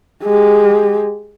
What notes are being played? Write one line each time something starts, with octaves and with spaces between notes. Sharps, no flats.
G#3 G4